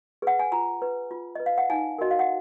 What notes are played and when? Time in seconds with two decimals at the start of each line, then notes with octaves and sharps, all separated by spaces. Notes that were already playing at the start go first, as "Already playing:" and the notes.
0.22 G#4 B4 F#5
0.39 G#5
0.52 F4 A#5
0.82 B4
1.11 F4
1.35 B4 D#5
1.46 F5
1.58 F#5
1.70 D#4 G#5
1.98 F#4 A#4 D#5
2.11 F5
2.19 F#5